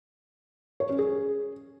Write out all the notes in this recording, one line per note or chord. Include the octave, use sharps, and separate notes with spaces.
C#5
C#4
G#4